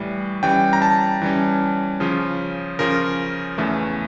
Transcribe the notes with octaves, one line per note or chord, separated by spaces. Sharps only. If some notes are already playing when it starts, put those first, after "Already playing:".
Already playing: A2 E3 G3
E3 G3 C#4 G5
A#5
A5
E3 G3 C#4
C#3 F3 C#4 F4
C#3 F3 C#4 F4 A#4
E2 C#3 E3 A3